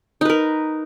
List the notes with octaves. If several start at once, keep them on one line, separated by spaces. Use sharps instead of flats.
D#4 A#4 B4